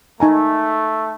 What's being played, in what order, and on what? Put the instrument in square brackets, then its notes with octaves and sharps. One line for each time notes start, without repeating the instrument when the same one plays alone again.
[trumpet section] A3 [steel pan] D#4 G#5 A#5